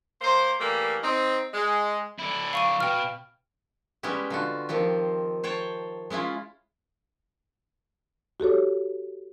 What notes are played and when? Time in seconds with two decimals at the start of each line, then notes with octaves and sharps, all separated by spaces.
0.21 A#3 C5
0.60 E3 G3 A3 A#3
1.02 C4 D#4
1.54 G#3
2.19 D3 E4
2.53 F5 C#6 D#7
2.80 B2 G5 F6
4.03 G3 G#3 B3 C#4 E4 G4
4.30 D3 F4 F#4
4.69 D#3 F3 C4 G4
5.44 C5 C#5 G5 A5
6.10 G#3 C#4 E4 F4
8.40 F#4 G4 A4 C#5